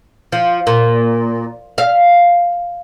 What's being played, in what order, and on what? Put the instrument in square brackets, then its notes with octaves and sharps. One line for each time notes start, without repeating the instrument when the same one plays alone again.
[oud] F3
A#2
F5